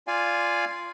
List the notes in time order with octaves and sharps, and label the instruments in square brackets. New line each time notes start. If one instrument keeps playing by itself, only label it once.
[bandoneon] F4 D5 F5 G#5